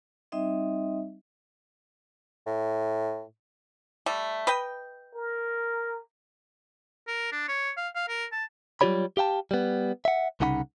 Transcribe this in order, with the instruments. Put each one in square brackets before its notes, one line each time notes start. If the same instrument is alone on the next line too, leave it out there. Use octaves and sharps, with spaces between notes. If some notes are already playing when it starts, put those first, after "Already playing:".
[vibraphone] G3 C4 D#4 D#5 E5
[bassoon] A2
[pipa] G3 A3
B4 D#5 G5
[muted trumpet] A#4
[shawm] A#4
D4
C#5
F5
F5
A#4
A5
[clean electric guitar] F#3 G3 F4 G4 C#5 B5
G4 F5 G5 A5
G3 B3
E5 F#5
C2 C#3 D#4 F#5 A#5 B5